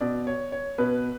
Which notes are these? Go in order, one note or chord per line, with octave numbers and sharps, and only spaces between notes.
B2 D5
C#5
C#5
B2 B4